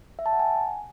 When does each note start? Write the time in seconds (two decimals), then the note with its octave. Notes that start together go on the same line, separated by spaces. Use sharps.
0.19 E5
0.26 A5
0.33 F#5
0.40 G#5